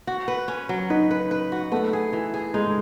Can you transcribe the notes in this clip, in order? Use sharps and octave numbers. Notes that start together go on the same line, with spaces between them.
F#4
B4
C#4
F#3
D#4 B4
B4
B4
F#4
A3 B3
G#4
E3
G#4
G#3 D#4